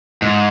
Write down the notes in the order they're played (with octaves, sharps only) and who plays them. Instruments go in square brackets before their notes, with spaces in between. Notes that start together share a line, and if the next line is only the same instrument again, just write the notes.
[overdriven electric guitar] G#2